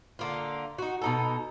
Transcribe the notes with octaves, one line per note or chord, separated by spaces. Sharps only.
D3 A#3 F4
D#4 F#4
B2 D#4 A4